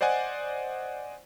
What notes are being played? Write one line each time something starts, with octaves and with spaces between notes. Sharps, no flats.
C5 D5 D#5 F#5 G#5